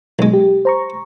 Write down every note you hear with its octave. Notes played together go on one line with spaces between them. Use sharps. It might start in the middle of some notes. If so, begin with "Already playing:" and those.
B1 G#3
G4
C5 A#5 C#6